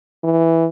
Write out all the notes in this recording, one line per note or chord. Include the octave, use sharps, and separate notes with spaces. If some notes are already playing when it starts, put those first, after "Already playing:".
E3